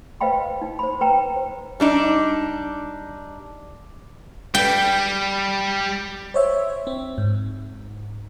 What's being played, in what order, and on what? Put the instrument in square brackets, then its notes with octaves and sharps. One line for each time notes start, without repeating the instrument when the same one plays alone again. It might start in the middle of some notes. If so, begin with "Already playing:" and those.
[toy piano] B4 C5 D#5 F5 G5 B5
D#4
C5 B5
B4 G5 A#5
C5
[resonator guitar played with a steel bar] G3 D4 D#4
[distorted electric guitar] G3 [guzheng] G5
[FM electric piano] C5 C#5 E5
C4
G#2